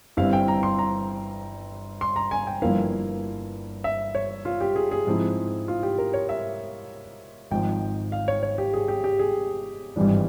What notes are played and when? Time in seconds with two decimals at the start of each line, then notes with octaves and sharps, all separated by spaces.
0.17 G1 G2 G3 C4 E4 F5
0.33 G5
0.48 A#5
0.63 C6
0.79 A#5
2.01 C6
2.16 A#5
2.31 G#5
2.47 G5
2.62 G1 G2 F3 A#3 E4 F5
3.84 E5
4.15 C#5
4.45 F4
4.61 G4
4.76 G#4
4.91 G#4
5.07 G#2 F3 C4 E4
5.68 F4
5.83 G4
5.98 A#4
6.14 C#5
6.29 E5
7.51 G#1 G#2 F3 G5
8.12 F5
8.28 C#5
8.43 C#5
8.58 G4
8.73 G#4
8.88 G4
9.04 G4
9.19 G#4
9.96 G#1 G2 E3 G3